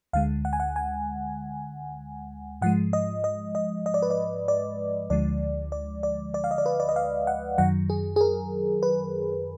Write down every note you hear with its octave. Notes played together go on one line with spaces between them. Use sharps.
D2 D3 G#3 F5
F#5
G#5
F#5
G#5
G#2 F3 G#3 F#5
D#5
D#5
D#5
D#5
D5
B4
D5
D5
D2 D3 F3 G#3 D5
D5
D5
D5
F5
D#5
D5
B4
D5
D#5
F5
F#5
F#2 D#3 F#3 F#5
G#4
G#4
A#4
B4